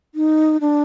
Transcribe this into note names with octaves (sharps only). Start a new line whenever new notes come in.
D#4
D4